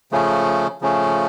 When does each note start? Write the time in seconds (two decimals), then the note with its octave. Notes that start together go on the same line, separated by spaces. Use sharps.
0.12 C#3 F3 A3 C#4
0.81 C#3 F3 A3 C#4